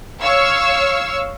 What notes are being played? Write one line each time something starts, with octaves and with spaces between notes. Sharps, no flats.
C#5 F5 C#6 E6